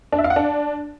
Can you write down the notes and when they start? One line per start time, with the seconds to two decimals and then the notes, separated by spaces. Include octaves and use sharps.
0.13 D4
0.18 E5
0.24 F5
0.30 F#5
0.36 D4